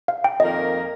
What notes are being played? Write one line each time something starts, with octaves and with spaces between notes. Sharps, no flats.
F5
G5
F2 D#3 A#3 F4 A#4 D#5